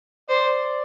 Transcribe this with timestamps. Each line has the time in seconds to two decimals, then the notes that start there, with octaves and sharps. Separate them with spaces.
0.29 C5 D5